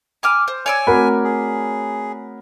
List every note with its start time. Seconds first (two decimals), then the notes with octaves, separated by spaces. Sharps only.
0.23 G#5 D6 F6
0.48 C5
0.66 C#5 D5 G#5 E6
0.87 A3 C4 F#4 A#4 F#5 B5
1.24 G#4